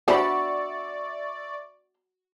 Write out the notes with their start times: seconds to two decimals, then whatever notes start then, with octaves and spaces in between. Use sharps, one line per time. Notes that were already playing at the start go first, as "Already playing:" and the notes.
0.08 B3 D4 F#4 C5 D5 E5 B5 C#6